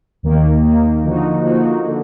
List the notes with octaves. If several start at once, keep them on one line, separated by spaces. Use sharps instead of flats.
D#2 D#3 A#3
D#2 D#3 A#3
D3 F3 A#3 D#4 F#4
D3 F3 A#3 D#4 F#4
D3